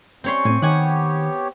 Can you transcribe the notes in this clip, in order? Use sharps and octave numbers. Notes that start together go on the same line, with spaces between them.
G3 C4 C#4 C#5 C6
A2 C4 G#5
D#3 B3 G4 C#5 F#5 G#5